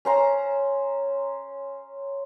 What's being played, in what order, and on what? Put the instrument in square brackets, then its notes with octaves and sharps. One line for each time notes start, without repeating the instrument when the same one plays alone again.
[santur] C#4 C5 A#5